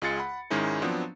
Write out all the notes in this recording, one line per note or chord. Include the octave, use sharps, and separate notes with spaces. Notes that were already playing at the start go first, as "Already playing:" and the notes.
C#2 G#3 F4 G#4 A6 C#7
F#5 B5
G#2 D#3 G#3 C#4 D#4 E4
F3 F#3 B3 C4 D4